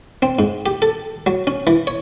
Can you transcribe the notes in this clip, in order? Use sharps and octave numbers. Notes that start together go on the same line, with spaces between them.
C4
G#2
G4
A4
F#3
C#4
E3
C#5